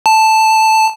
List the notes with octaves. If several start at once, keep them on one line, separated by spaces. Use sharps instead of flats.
A5